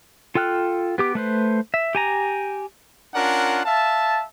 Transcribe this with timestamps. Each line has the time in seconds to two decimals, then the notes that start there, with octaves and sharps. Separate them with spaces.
0.35 F4 A4 G5 F6 F#6
0.98 B3 G4 D6
1.15 A3 B4 C5
1.74 E5
1.95 G4 G#5 A#5
3.15 C#4 D4 F4 A#4 F#5
3.66 E5 F5 A5